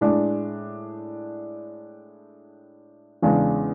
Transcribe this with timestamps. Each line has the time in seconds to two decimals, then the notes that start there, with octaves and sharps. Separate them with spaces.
0.01 A2 G#3 D4
3.22 E2 C#3 G#3 D4